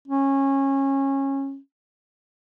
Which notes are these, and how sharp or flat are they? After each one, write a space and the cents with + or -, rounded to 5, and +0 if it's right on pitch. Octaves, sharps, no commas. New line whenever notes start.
C#4 -20